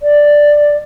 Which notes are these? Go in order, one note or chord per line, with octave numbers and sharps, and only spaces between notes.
D5